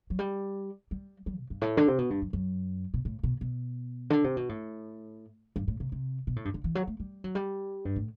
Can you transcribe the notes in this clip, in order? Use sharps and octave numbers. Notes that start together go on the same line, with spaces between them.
F#3
G3
G3
G3
B2
G2
A2
D3
C3
B2
G2
F#2
F#2
B2
A2
B2
B2
D3
C3
B2
A2
G2
A2
C3
C3
B2
A2
G2
D3
E3
F#3
A3
G3
F#3
G3
G2
A2